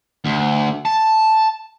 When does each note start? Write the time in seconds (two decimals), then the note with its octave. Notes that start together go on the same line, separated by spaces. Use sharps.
0.25 D2
0.85 A5